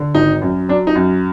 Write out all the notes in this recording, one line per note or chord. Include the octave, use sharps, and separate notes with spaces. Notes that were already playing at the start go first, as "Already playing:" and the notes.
Already playing: D3
G#1 D#4
F#2
F#3 D4
D#4
F#2